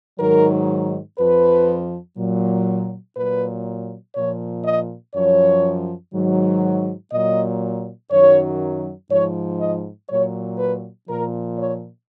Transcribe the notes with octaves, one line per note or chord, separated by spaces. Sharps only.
G#2 D#3 F#3 A#4
F2 F3 B4
A#2 F#3
A#2 F#3 B4
A#2 F3 C#5
D#5
F#2 F3 C#5
G#2 D#3 F#3
A#2 F#3 D#5
F#2 D#3 F#3 C#5
G#2 F3 C#5
D#5
A#2 F#3 C#5
B4
A#2 F3 A#4
C#5